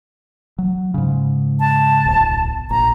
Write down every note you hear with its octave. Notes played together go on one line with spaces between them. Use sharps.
F#3
G#2 C#3
A5
D1 B1
A#1 A#5